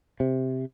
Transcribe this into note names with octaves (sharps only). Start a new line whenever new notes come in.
C3